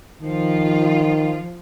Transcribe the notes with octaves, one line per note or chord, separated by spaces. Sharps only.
D#3 F3 F4